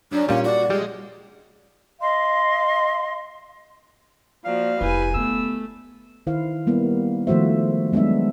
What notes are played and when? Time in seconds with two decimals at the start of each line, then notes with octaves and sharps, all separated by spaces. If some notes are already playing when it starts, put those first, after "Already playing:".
0.12 F#2 D4
0.29 A#2 G3 C#4 F5
0.45 F#4 D5
0.70 G3 G#3
1.99 D#5 F5 C6
4.45 F3 A#3 F#4 D5 F5
4.81 F1 E4 G4 B4 G#5
5.14 D3 A3 B3 C#4 E6
6.27 D#3 E4 C5 F5
6.67 G3 A#3 B3 E4
7.27 D#3 F3 A3 F#4 C5 E5
7.92 F#3 G#3 B3 D4 E5